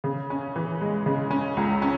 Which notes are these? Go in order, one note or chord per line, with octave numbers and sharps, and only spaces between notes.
C#3
C#4
E3
G#3
C#3
C#4
C#2
C#4